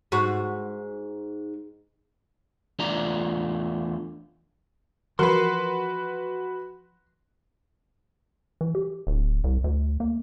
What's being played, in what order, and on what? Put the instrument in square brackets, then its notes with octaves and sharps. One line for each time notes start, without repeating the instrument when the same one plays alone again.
[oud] G#2 F#4
[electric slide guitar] E2 A3 D4 F4 D5 A#5
[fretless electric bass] E3 F3 [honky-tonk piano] F#4 B4 [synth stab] A#4 [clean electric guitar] C6
[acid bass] E3
G4
D1
C2
D2
A#3